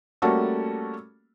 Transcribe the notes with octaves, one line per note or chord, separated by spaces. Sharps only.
G3 A3 A#3 C#4 F#4 A4